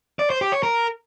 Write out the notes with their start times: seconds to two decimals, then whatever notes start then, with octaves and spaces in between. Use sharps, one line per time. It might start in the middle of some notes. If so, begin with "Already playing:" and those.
0.19 D5
0.30 C5
0.41 G4
0.52 C#5
0.63 A#4